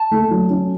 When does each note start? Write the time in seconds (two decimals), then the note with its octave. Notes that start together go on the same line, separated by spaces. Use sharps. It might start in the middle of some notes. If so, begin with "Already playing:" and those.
Already playing: A5
0.11 A3
0.31 F#3
0.50 C#4